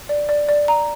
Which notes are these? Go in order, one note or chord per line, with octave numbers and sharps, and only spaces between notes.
D5
D5
D5
A#5